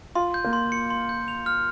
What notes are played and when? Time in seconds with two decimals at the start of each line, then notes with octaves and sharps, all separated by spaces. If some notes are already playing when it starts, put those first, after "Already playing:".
0.15 F4 C6
0.34 G6
0.44 A#3
0.53 C6
0.72 C#7
0.90 C6
1.09 G6
1.28 F7
1.46 F6